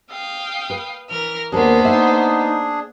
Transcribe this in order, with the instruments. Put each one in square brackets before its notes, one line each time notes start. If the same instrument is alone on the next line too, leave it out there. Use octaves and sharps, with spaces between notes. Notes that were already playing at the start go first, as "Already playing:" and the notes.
[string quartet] F5 G5 D#6
[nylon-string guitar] B4
[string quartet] E3 A#4 F6
[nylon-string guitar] D#2 A#4 [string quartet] A#3 B3 C5 [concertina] D4 G#4
[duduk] D#4 [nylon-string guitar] E5